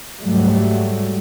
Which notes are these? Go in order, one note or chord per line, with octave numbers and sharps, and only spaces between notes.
G#2 F#3 G3 A3